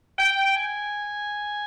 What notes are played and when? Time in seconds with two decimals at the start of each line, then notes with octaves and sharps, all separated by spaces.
0.19 G5
0.56 G#5